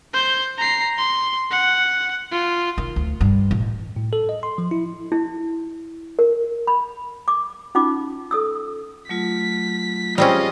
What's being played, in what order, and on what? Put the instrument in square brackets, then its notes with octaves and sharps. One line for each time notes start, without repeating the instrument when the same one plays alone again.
[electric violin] C5 G6
A#5 C7
C6
F#5
F4
[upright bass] D#3
D2
G2
A1
[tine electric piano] A2
A4
D#5
C6
F3
E4
[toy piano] E4
A#4
B5
D6
C#4 D#4 F4 D6
A4 D#6 E6
[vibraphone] F#3 A3 F4 [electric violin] B6
[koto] G3 C4 C#4 [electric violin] F4 D#5 [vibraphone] G4 G#4 D5